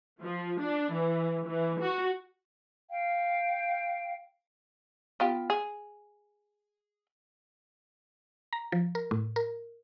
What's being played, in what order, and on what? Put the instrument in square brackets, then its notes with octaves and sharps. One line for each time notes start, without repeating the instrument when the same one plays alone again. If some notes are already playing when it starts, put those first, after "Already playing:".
[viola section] F3
D4
E3
E3
F#4
[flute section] F5 G5
[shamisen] B3 F4 G4
G#4
[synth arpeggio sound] A#5
F3
A#4
A2
A#4